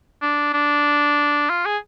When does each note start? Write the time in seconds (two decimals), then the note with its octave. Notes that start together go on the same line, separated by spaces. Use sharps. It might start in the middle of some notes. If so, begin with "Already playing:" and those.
0.22 D4
0.54 D4
1.50 F4
1.66 G#4